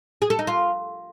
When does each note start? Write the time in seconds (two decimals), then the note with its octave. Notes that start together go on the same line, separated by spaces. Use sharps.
0.22 G#4
0.30 A4
0.39 D#4
0.47 F4